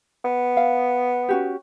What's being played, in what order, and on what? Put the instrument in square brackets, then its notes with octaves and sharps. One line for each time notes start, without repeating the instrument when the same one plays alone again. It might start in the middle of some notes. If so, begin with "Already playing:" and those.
[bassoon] B3
[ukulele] F5
C#4 F#4 G4